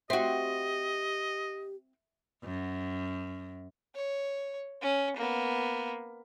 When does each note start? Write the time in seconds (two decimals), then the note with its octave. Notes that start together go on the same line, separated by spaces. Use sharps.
0.10 C4 F#4 G4 D#5 E5
2.44 F#2
3.95 C#5
4.81 C#4
5.17 A#3 B3